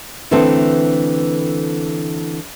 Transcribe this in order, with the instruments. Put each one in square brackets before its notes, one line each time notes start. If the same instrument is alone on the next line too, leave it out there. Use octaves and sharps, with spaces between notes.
[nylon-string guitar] D3 E3 A3 C4 A4